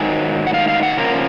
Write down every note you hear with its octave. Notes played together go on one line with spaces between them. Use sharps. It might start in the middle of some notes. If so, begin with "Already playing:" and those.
Already playing: G#2 D#3 F#3 G#5
F#5
F5
F5
F#5
C#3 F3 A#3 A#4